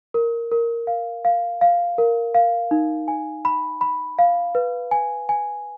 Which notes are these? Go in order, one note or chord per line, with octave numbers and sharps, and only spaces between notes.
A#4
A#4
F5
F5
F5
A#4
F5
D#4
G#5
B5
B5
F5
B4
G#5
G#5